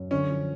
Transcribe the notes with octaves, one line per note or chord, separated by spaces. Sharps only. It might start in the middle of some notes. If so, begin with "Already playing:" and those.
Already playing: F#2
D3 C#4
F3